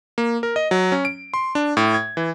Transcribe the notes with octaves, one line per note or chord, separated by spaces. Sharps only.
A#3
A#4
D#5
F#3
C#4
D7
C6
D4
A2
G#6
E3